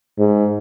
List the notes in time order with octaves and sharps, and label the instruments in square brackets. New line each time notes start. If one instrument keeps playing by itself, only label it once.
[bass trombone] G#2